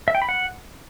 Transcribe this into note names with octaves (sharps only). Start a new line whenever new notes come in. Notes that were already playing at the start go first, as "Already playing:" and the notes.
E5
G5
B5
F#5